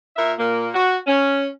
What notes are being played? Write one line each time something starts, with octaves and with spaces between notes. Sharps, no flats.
A#2 A#4 E5
A#2 A#3
F#4
C#4